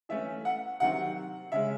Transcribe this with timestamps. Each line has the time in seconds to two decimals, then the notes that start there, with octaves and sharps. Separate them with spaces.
0.09 E3 A3 C#4 E5
0.45 F#5
0.80 C3 D#3 F#3 C4 F#5
1.52 C#3 G#3 C#4 E5